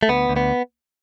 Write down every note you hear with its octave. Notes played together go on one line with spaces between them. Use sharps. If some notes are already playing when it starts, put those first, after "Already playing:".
A3
D2 B3
D2
B3